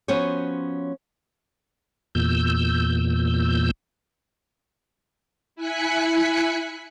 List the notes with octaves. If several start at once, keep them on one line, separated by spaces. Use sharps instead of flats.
F3 B3 C#4 F#4 C5 C#5
E2 A#2 E6 G6
E4 G#5 F#6 B6 C#7